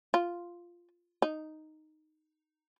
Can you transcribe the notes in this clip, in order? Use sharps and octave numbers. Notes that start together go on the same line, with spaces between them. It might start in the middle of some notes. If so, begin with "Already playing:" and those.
F4
D#4